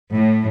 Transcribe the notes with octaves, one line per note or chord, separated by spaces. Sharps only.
A2